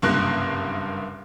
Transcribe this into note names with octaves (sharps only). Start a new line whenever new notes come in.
F#1 C2 G2 A#3 F#6